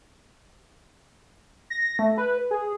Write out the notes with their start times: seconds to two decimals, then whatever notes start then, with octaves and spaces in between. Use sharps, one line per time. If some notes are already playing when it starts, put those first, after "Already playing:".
1.70 A#6
1.99 A3
2.18 B4
2.51 G#4